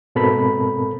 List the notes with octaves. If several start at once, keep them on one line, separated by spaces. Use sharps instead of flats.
G#2 B2 C4 A4 A#4 B5